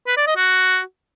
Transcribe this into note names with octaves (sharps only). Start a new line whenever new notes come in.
B4
D5
D#5
F#4